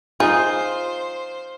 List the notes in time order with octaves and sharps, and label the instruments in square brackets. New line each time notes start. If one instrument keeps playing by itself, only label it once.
[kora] D#4 [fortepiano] F4 [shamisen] G#4 [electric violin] C5